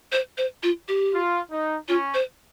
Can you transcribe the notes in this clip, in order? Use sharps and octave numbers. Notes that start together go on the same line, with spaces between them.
C5
C5
F4
G4
F4
D#4
C#4 F4
C5